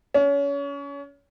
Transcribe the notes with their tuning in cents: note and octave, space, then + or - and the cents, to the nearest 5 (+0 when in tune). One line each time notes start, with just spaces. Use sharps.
C#4 +30